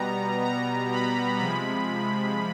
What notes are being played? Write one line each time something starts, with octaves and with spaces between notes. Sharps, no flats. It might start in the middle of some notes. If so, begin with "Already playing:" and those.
Already playing: B2 G3 B3 A#5
A#5
B5
C3 F3 G#3 B5